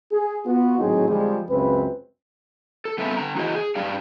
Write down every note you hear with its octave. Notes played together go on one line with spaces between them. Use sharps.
G#4
B3 F4 F#4
G#1 A2 F#3 C4 D#4 G#4
F2 D3 F3 G3 G#3
C#2 F#2 C4 B4
A4
G3 B3 C4 A4 B4 E5
D3 A#5
E3 E4 F#4 G#4 C5 D#5
G#4
G2 G3 D#4 G4 D5 F5